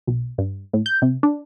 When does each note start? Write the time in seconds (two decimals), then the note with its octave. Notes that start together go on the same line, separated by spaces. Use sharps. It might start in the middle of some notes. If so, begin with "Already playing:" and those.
0.07 B1
0.38 G2
0.73 A2
0.86 G6
1.02 C3
1.23 D4